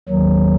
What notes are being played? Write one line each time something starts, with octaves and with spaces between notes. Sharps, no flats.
D#2 D#3 F#3